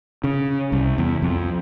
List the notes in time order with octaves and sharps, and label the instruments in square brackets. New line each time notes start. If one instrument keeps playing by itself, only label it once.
[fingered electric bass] C#3
C2
E2
F2